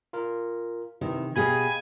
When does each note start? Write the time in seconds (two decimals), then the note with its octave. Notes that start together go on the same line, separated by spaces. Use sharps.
0.13 F4 A#4
1.01 C3 D#3 E3
1.36 B2 G4 G#4 D#5 F5 G#5 B5